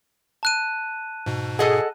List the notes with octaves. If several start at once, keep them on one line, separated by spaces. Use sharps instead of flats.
A5 F#6 D#7
G#2 B2
G#4 A4 D#5 F#5